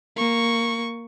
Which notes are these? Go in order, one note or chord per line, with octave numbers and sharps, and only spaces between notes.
A#3 C#6